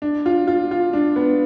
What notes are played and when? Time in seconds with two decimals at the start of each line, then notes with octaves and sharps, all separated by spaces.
0.02 D4
0.26 F4
0.47 F4
0.71 F4
0.93 D4
1.16 B3